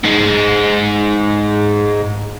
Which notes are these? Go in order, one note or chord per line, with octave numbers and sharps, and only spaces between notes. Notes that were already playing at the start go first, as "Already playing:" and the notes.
G#2 G#3